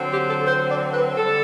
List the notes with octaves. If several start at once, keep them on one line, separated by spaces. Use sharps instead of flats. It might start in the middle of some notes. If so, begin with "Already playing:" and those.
Already playing: D3 F#3 C4
G4
A4
C5
D5
B4
D3 G3 D4 A4